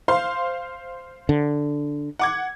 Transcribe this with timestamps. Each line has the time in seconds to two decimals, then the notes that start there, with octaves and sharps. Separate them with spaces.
0.08 C5 F5 C6
1.29 D3
2.19 F#5 D6 G#6